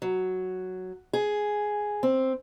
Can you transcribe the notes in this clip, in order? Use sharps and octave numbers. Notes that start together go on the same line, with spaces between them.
F#3
G#4
C4